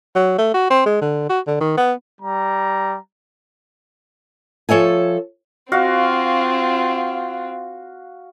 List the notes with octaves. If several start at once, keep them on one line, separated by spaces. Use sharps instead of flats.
F#3
A3
F#4
C4
G#3
D3
F#4
D3
D#3
B3
G3 A#5
F3 A4 C#5 E5 G#5
C4 F4 F#4 F5